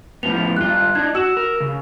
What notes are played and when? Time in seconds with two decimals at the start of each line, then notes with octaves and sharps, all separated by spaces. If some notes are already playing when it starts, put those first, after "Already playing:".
0.23 A2 F3 B3 F7
0.56 G2 F4 F#6
0.95 D4 D#4 G#6
1.15 F#4 E6 E7
1.37 A#4
1.60 C#3